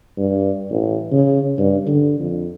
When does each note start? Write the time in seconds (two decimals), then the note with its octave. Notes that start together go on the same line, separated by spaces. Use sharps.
0.17 G2
0.71 A1
1.12 C#3
1.58 G2
1.87 D3
2.19 F2